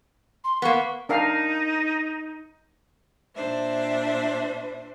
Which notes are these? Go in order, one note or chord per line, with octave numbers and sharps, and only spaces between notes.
C6
A#3 B3 C#6
D4 D#4 A#4 F5
A#2 D4 C5 E5